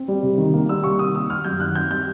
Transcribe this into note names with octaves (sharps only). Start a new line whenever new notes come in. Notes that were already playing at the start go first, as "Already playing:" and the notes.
Already playing: C4
G3
C3
D#3
A#3
G3 E6
C3 C#6
D#3 D#6
A#3 E6
G3 F6
F#2 G6
D#3 F#6
C4 G6
G3 G6